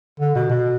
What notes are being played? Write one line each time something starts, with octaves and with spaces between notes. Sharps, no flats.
D3
B2
B2